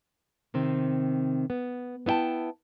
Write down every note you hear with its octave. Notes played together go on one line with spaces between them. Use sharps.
C3 D#3 C4
B3
B3 E4 D5 G5 A5